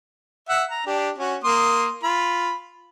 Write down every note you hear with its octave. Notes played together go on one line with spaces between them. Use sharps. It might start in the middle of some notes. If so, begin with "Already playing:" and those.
E5 F#5
A#5
D4 G4
C#4 F#4
A#3 C6 D#6
F4 B5